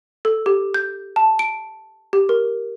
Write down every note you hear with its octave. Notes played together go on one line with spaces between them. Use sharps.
A4
G4
G6
A5
D7
G4
A#4